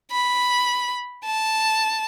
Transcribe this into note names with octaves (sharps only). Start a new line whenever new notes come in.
B5
A5